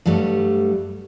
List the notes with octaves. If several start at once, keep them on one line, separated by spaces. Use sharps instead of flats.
G2 F#3 G3 A3